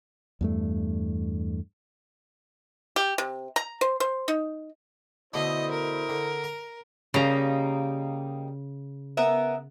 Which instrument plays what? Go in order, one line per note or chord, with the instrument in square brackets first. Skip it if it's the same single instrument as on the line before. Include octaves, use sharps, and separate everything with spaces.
[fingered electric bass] E2 G2 A3
[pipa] G4
C3
A#5
C5
C5
D#4
[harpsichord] B2 D3 A3 [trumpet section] E4 C5 D#6 [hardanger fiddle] D#5
[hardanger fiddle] A#4
[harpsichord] D3
A#5
[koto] C#3 A#5 [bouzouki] G3 A#3 D#4
[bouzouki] B3 A#4 E5